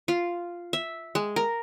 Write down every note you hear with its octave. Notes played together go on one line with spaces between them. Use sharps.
F4
E5
G#3
A#4